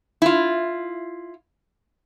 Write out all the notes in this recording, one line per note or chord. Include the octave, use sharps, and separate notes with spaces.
E4 F4